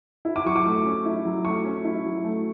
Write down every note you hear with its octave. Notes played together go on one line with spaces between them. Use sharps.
E4
D6
F#3 C#6
D6
A3
C#4
E4
F#3
A3 C#6
C#4
E4
F#3
A3